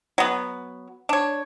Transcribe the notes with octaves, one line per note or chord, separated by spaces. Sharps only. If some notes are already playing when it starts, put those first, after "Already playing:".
F#3 B3
D4 C#5